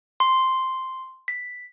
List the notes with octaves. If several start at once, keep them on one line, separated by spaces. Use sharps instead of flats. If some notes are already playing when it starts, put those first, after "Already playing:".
C6
B6